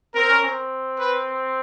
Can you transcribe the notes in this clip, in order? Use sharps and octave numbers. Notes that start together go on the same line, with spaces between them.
C4 A#4
C#4
C4
B4